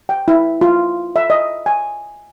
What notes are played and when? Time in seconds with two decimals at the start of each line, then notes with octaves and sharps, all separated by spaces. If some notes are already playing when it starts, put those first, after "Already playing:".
0.09 G5
0.28 E4
0.61 F4
1.16 E5
1.30 D#5
1.66 G#5